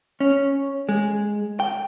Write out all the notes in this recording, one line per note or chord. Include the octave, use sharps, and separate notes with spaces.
C#4
G#3
G5